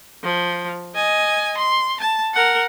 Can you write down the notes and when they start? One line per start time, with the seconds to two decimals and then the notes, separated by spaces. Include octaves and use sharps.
0.23 F3
0.95 D#5 G#5
1.58 C6
2.01 A5
2.34 A#4 F#5